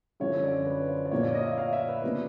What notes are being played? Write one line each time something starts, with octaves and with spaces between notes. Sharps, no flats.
F#2 D3 F3 C#5
D5
B4
C5
D5
A#2 F3 A#3 C#5
D5
D#5
F5
E5
F5
E5
B4
C#3 F3 A#3 D4